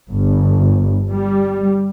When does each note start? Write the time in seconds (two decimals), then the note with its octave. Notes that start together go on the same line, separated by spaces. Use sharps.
0.12 G1
1.10 G3